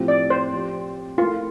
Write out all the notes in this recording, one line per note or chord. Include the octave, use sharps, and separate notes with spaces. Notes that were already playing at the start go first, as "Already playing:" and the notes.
Already playing: A2 F3 C4 G4
D5
C5
F3 C4 G4
A3 E4 F4 A#4